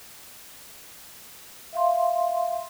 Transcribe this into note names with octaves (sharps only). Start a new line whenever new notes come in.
E5 F5 C6